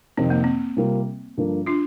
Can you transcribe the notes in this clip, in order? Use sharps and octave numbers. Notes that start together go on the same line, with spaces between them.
F2 C3 D#3 C4
A#3
C4
C3 G3 A#3 F4
G2 D3 F3 A#3
D4 F4